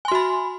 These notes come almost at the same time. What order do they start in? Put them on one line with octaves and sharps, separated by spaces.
G#5 C6 F#4 B5